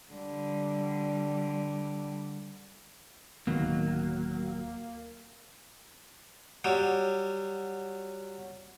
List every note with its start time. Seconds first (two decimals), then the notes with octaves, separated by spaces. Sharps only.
0.11 D3 G3
3.47 D1 D#3 F#3 A#3 B3
6.64 F#3 G3